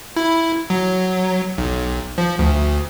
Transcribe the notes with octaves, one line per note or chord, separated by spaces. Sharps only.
E4
F#3
B1
F3
D2